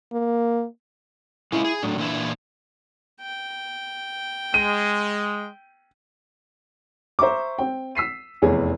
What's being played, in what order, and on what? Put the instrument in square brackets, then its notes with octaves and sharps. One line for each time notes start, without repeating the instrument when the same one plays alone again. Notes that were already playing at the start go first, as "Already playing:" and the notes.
[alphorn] A#3
[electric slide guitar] G#3 C#4 F4 [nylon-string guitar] E4
[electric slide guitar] G#4
[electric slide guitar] A2 F#3 [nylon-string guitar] D4
[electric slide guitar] A#2 E3 E4 [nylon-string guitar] D4
[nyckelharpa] G5
[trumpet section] G#3 [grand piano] D#7
[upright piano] C5 E5 A#5 C#6 D6
C4 G5
E6 B6 C7 D#7
F1 E2 G#4 C#5